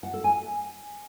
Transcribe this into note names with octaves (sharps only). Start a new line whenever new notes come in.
F#5
A4
G#5